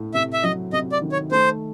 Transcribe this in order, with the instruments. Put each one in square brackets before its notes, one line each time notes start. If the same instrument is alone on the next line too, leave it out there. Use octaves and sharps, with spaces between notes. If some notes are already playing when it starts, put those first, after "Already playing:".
Already playing: [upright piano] A2
[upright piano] C3 [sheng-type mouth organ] E5
[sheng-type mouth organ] E5
[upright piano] F#3 [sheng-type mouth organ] D#5
[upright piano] C3 [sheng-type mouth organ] D#5
[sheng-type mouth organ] D5
[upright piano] D#3
[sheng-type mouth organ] C#5
[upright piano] A3 [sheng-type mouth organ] C5